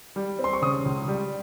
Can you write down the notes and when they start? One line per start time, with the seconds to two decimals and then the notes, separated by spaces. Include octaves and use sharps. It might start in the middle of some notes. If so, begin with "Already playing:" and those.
0.16 G3
0.39 C4
0.44 C6
0.53 C#6
0.62 C#3 D#6
0.85 C#2
1.08 G3